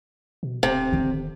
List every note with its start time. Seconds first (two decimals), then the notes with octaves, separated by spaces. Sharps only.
0.43 B2
0.63 D1 C3
0.92 D3 D#3